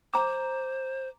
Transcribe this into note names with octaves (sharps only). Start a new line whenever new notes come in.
C5 A#5 D6